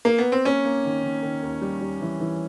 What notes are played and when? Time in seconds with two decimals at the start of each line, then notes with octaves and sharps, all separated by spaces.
0.05 A#3
0.18 B3
0.32 C4
0.45 A#3 C#4
0.65 A#3
0.85 D#3
1.03 D#3
1.23 D#3
1.43 D#2
1.61 G3
1.81 G3
2.01 E3
2.20 E3